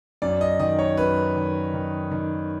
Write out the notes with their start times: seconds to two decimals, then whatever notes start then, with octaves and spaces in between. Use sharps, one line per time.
0.22 F#2 D5
0.41 D#5
0.60 D#3 D#5
0.79 C#5
0.97 F#2 B4
1.35 D#3
1.74 D#3
2.11 D#3